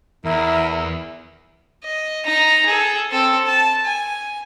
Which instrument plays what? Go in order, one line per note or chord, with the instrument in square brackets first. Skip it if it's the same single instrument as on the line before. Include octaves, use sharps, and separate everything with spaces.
[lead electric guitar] E2 [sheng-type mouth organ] E4 A#4
[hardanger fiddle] D#5
D#4 A#5
G#4 A4
C4 A4
A5
G#5